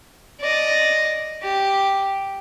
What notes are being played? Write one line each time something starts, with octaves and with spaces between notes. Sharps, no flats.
D5 D#5
G4